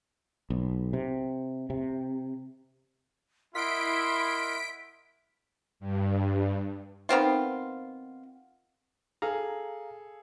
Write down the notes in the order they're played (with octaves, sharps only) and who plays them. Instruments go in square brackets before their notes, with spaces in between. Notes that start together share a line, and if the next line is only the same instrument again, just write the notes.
[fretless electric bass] B1
C3
C3
[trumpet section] E4 [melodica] A#4 D#5 F#5 [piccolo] C6 [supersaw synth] B6 D7
[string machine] G2
[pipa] D#3 B3 C4 F4
[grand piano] G#4 A4 [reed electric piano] F5 A#5